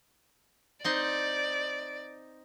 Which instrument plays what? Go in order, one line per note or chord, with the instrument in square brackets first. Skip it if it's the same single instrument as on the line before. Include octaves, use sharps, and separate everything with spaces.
[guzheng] C4 D#4 C6 [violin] D5